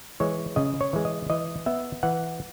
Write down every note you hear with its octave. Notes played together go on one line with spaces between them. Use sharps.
E3 G#3 C#5
C#3 D#5
C#5
E3 G#3
D#5
E3 D#5
B3 E5
E3 F#5